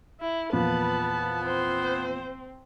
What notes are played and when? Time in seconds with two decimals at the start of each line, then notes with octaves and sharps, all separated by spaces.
0.21 E4
0.53 E2 A#2 F3 B3 B4 A5
1.46 C4 C5